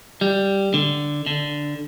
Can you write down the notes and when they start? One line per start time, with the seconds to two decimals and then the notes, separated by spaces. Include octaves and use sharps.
0.21 G3
0.74 D3
1.27 D3